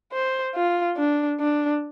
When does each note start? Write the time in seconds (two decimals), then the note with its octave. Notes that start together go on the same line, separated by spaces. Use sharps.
0.13 C5
0.55 F4
0.97 D4
1.40 D4